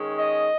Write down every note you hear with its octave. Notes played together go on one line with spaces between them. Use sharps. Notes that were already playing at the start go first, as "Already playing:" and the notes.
Already playing: D#3 G#3 C#4
D#5